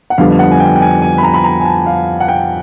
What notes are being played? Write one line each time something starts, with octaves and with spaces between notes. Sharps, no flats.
F#5
F2 D3 G3 B3 D4 F5
F#5
G#5
G5
G5
G#5
G#5
B5
A#5
B5
A#5
G#5
A5
F5
F#5
G5